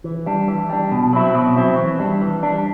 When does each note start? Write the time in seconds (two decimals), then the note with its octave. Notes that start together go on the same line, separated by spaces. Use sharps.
0.04 E3
0.26 G3 D4
0.48 E3
0.70 G3 D4
0.92 B2
1.13 F#3 C4 E4
1.35 B2
1.56 F#3 C4 E4
1.78 E3
1.99 G3 D4
2.21 E3
2.43 G3 D4